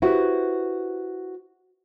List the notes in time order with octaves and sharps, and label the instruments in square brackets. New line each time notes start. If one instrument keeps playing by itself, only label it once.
[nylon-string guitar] E4 F#4 G4 B4 C5